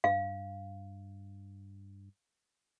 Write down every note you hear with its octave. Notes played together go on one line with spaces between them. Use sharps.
G2 F5